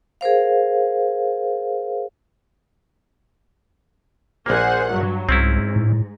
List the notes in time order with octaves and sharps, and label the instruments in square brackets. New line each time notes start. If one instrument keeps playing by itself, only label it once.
[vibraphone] G#4 A#4 C5 F5
[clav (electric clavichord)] A#1 A#3 [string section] G#4 C5 F#5
[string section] G2 F#3
[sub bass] C2 [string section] G#2 [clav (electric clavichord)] C4 C#4 E4
[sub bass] A2